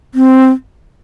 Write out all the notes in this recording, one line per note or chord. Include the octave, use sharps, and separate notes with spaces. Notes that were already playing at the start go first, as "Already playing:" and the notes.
C4